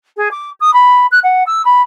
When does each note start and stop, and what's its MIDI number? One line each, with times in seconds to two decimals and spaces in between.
0.16 0.28 68
0.31 0.50 86
0.60 0.73 87
0.73 1.06 83
1.11 1.19 90
1.23 1.43 78
1.46 1.62 88
1.65 1.81 83